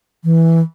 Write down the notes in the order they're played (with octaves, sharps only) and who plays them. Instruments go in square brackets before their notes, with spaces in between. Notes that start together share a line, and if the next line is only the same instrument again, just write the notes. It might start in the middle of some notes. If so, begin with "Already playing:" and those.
[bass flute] E3